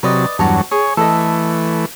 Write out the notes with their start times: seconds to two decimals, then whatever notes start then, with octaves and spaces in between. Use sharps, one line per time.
0.03 C3 F#3 B4 D5 D#5
0.39 E2 G2 F#3 F#4 C#5 A5
0.71 G#4 C#5
0.97 E3 A3 A4 D#5